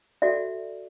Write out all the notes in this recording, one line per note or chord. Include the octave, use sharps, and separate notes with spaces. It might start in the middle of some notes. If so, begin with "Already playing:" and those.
F#4 A4 D5 E5